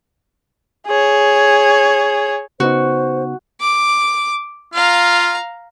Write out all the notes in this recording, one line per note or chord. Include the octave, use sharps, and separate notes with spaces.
G#4 C#5
C#3 B3 D#4 F#4 C5
D6
F4 F5 A#5